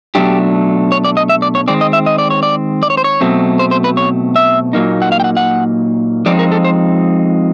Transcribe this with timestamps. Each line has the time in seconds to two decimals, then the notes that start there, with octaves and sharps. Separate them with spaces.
0.15 B2 F#3 A3 D4 G4
0.92 C#5
1.04 D5
1.17 D#5
1.29 E5
1.42 D5
1.55 C#5
1.68 D#3 G#3 C4 D5
1.81 D#5
1.93 E5
2.06 D#5
2.18 D5
2.30 C#5
2.43 D5
2.83 D5
2.90 C#5
2.97 C5
3.04 C#5
3.21 B2 F#3 A3 C4
3.59 C5
3.71 C5
3.84 B4
3.97 C#5
4.36 E5
4.73 A#2 F#3 A#3 D#4
5.02 F#5
5.12 F5
5.20 G5
5.24 F#5
5.37 F#5
6.26 F3 G#3 C4 D#4 D5
6.39 A#4
6.52 A4
6.64 C5